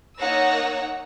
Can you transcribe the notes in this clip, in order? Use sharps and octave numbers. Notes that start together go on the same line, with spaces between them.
A#3 D#4 C#5 F#5 E6 A#6